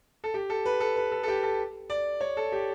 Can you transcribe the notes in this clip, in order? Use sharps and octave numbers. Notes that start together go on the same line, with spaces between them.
A4
G4
A4
B4
A4
B4
A4
A4
G4
A4
D5
C#5
A4
G4